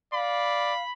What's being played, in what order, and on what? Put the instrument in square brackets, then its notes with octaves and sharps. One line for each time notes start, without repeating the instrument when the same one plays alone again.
[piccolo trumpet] D5 [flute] F5 [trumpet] B5